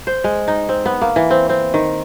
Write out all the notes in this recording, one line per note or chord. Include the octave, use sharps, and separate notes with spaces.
C5
G#3
D#4
C4
B3
A#3
E3
C4
C4
D#3